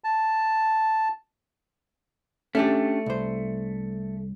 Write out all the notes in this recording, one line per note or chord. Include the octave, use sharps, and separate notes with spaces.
A5
A3 C#4 D4 G4
C2 C5